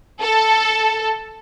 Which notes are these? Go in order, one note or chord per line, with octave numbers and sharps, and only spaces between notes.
A4